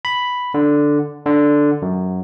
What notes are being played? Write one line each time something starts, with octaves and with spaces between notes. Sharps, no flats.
B5
D3
D3
F#2